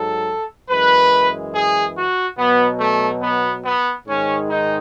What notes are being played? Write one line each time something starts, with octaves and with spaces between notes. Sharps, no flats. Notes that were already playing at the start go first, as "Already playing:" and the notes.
Already playing: G#2 F#3 A4
F#2 E3 G#3 B4
G#4
F#4
B2 F#3 B3
A3
B3
B3
G#2 D#3 G#3 C#4
D#4